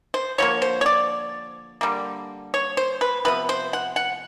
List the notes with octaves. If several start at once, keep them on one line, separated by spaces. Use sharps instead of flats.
C5
D3 F3 A#3 C#5
C5
C#5
D5
D3 G3 A#3
C#5
C5
B4
C3 F3 B3 B4
C5
F#5
F#5